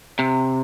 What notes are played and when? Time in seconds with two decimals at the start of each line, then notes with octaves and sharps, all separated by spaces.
0.19 C3